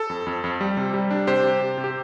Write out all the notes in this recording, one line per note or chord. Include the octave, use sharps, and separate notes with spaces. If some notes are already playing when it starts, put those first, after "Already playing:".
Already playing: A4
F2
F2
F2
G3
C3
G3
D4
C3 G4 C5
C3
C3
C3
G4